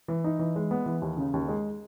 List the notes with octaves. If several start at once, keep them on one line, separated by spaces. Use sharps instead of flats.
E3
D#4
E3
G#3
B3
E3
D#2
C#3
D#2
G#3